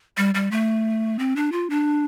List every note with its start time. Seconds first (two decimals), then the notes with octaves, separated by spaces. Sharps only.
0.17 G3
0.35 G3
0.51 A3
1.19 C4
1.36 D4
1.52 F4
1.70 D4